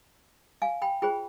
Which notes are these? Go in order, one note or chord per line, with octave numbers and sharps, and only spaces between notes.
F5 G#5
G5 B5
F4 G#4 C5 G5 B5